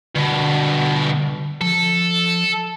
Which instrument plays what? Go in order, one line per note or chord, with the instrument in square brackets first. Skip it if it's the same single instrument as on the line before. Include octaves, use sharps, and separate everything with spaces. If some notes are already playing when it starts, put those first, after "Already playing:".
[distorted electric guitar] G2 B2 [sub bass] D3
[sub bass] F3 [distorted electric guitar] A4